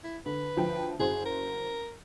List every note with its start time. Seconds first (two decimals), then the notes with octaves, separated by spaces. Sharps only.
0.04 E4
0.26 D3 B4
0.56 D2 F3 G5
1.00 F#1 F#4 G#4 C5
1.26 A#4